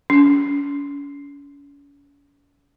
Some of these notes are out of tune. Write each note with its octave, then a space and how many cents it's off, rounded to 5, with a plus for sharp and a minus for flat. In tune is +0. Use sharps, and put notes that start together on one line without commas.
C#4 +40